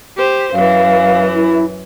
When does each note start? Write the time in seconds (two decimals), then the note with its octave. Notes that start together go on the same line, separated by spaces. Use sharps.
0.17 G4 C5
0.54 F#2 E3 F5
1.35 E4